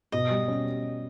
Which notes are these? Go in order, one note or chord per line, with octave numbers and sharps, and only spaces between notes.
B2 D#5
G3
C#4